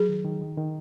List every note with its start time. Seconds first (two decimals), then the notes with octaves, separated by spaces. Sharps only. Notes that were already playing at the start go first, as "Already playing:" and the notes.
Already playing: F#3 G#4
0.09 D#3
0.25 D#3
0.41 D#3
0.58 D#3